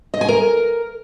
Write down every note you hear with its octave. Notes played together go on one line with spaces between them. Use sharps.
D#5
G#5
A#4